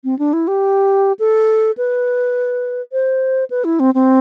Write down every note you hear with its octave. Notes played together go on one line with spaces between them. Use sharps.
C4
D4
E4
G4
A4
B4
C5
B4
E4
C4
C4